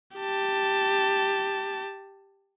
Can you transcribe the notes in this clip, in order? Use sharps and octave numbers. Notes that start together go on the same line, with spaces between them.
G4 A5